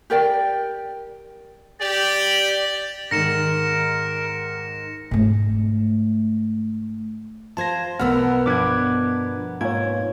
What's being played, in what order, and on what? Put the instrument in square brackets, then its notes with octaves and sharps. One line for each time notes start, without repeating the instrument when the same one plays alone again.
[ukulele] G4 A#4 D5 G5
[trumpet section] G4 [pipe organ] D5
[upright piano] G#2 D#3 [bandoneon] A#4 [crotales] A#6 C#7 E7
[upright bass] G#2 A3
[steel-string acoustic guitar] F4 C5 [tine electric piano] A5 G#6 A#6
[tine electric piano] B1 F6 [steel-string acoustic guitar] B2 B3 A#4 [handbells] F#5 E6
[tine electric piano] G2 F3 D4 [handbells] D6 F#6 G#6
[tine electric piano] G#2 F4 G#6 [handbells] A#3 C#5